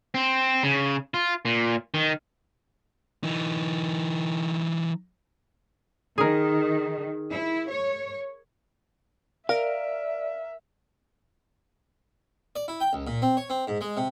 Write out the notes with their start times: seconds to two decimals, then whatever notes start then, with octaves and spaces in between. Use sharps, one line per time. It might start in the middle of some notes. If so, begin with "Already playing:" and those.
0.14 C4
0.64 C#3
1.14 F4
1.45 A#2
1.94 D#3
3.24 E3 D#4
6.18 D#3 G#4 A#4
7.30 E4
7.68 C#5
9.49 A#4 D5 E5 F5 F6
12.56 D5
12.68 E4
12.80 G5
12.93 C#2
13.07 A#2
13.22 C4
13.37 C#5
13.50 C4
13.67 G#2
13.81 G#3
13.97 C3